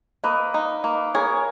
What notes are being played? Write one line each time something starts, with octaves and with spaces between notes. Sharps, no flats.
A#3 B4 D#5
D#4
A#3
G#4 A#4 C#5